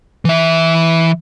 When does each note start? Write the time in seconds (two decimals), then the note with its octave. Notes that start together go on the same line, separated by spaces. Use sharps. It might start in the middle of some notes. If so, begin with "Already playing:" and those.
0.25 E3 E5